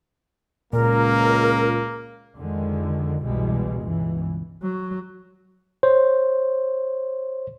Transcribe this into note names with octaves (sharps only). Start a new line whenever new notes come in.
C#2 A#2 A#3 A#4
F2 D3 D#3 G#3
G1 C2 B2 E3 G3 G#3
C#2 G2 B2 E3
F#3
C5 C#5